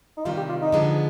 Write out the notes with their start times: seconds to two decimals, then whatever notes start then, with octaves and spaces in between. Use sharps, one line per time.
0.17 D#4
0.25 C3 D#3 G3 F4
0.37 G4
0.49 F4
0.62 D#4
0.72 D3 F3 G#3 B3